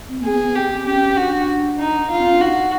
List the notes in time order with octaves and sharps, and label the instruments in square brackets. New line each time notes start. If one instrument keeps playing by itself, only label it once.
[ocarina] C4
[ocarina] A#3 [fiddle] G#4
[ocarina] B3
[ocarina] C4 [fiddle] G4
[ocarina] C4
[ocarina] C#4 [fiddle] G4
[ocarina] D4 [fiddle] F#4
[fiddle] D#4
F4
[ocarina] C4
C#4
D4
[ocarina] D#4 [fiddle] F#4